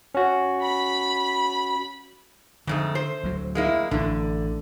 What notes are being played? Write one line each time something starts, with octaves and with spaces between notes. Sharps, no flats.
C#4 F#4
B5
F2 G#2 D3 A3
C5
D2 F#3
G#3 A#3 E4
A1 D3